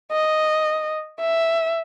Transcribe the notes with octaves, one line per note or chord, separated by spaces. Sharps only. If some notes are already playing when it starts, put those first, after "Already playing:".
D#5
E5